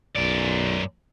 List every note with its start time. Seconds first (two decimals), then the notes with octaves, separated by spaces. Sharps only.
0.16 B1 F#2 D5